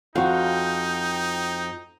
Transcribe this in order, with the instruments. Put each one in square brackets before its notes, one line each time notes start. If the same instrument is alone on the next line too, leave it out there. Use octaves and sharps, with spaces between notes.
[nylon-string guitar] F2 [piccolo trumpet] D#4 [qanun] F#4 F5 [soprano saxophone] G5